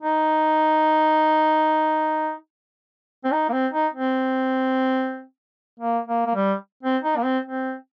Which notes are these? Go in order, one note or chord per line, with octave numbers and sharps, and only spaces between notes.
D#4
C4
D#4
A#3
C4
D#4
C4
A#3
A#3
A#3
G3
C4
D#4
A#3
C4
C4